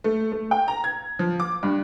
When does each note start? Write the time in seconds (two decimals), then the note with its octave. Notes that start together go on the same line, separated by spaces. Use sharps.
0.04 A3
0.32 A3
0.51 G5
0.68 A#5
0.84 G#6
1.19 F3
1.40 D6
1.63 G2